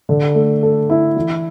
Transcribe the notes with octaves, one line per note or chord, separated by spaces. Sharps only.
D3
A3
A4
E4
E3